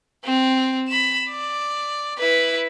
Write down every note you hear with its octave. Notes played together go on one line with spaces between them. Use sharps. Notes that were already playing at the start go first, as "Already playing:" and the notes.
C4
B5 E7
D5
E4 B4